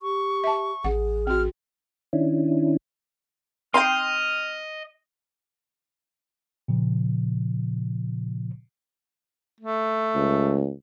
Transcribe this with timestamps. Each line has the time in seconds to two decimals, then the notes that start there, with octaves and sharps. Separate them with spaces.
0.01 G4 C#6
0.44 E5 A5
0.84 A1 G#4 F#5
1.27 C4 F#4 F6
2.13 D#3 C#4 D4 E4
3.74 C4 D#4 D#5 F5 G5 C6 F6
6.68 A#2 C#3 F3
9.60 A3
10.15 C#2